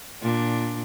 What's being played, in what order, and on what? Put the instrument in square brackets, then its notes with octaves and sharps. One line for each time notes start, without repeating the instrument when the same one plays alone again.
[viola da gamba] A#2 D4